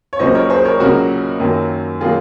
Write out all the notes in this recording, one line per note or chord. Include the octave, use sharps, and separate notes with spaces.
C#5
C#2 C#3 F#3 A#3 C5 D#5
A#4 C#5
G#4 C5
A#4 C#5
C#2 C#3 F#3 A#3 F#4 A#4
F#2 D#3 F#3 A#3
D#3 F#3 A#3 F4 G#4